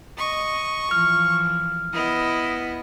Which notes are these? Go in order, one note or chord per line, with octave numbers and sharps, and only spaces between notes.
D#5 C#6
E3 F3 F6
B3 E4 D#5